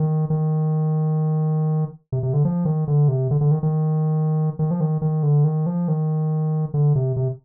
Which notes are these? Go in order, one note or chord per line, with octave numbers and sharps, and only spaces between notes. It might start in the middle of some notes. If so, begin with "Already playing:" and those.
Already playing: D#3
D#3
C3
C3
D3
F3
D#3
D3
C3
D3
D3
D#3
D#3
D#3
F3
D#3
D#3
D3
D#3
F3
D#3
D3
C3
C3